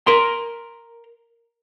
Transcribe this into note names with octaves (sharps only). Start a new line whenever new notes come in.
A#4 C6